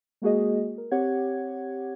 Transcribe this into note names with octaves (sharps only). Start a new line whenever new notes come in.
G#3 A#3 F#4 G#4 D#5
A#4
C4 G4 C#5 F#5 G#6